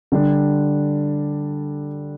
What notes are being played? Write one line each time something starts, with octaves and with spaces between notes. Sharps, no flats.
D3 G3 D4